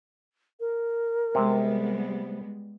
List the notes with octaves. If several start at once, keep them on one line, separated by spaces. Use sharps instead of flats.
A#4
C3 G3 G#3 B3